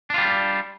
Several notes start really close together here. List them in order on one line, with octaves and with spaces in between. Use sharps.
D4 F4 G3